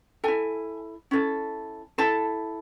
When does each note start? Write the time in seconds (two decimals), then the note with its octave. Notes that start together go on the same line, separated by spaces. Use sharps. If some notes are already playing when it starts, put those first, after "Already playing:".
0.24 E4 A4 G#5
1.11 C#4 E4 A4
1.98 E4 A4 A5